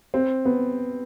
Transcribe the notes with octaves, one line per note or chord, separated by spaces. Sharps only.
C4
B3